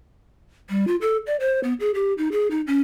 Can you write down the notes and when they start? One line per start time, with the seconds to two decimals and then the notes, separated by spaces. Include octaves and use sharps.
0.70 G3
0.87 F4
1.01 A4
1.27 D5
1.40 C5
1.64 B3
1.80 G#4
1.94 G4
2.18 D#4
2.32 G#4
2.51 D#4
2.67 C#4